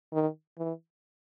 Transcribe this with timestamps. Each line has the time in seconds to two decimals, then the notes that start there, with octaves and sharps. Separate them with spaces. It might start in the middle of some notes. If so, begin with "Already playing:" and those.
0.13 D#3
0.58 E3